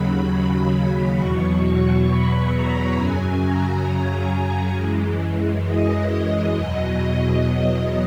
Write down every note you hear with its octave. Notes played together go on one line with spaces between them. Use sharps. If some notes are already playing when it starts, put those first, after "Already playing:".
Already playing: D#2 C#3 F#3 B5
E2 B2 F#3 C#6
C#6
B5
A#5
F#2 C#3 F#3 G#5
A#5
A#5
G#5
F#2 E3 G#3
D#5
E2 B2 F#3